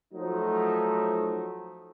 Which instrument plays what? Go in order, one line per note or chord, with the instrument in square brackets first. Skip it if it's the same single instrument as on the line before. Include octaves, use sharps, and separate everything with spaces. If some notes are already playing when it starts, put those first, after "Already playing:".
[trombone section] F3 F#3 A3 D#4